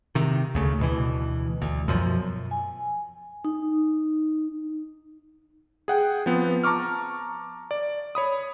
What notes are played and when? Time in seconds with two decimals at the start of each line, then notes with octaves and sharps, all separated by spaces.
0.15 C3 D#3
0.55 D2 C#3 A3
0.79 D2 B2 E3
1.62 D2
1.88 F#2 B2 F3
2.51 G#5
3.44 D#4
5.88 G#4 F#5 G5
6.26 F3 B3 C4
6.64 A5 A#5 C#6 D6 F6
7.71 D5
8.15 C#5 B5 D#6